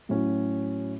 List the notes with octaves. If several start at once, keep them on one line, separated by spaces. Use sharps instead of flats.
A2 F#3 C#4 F#4